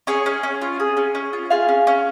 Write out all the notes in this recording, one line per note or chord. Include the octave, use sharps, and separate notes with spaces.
C#4 G#4 C#5
C#4
C#4
F4
G#4
C#4
C#4
F4
F4 G#4 F5
C#4
C#4